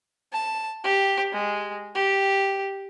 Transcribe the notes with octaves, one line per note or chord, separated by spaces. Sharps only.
A5
G4
G#3
G4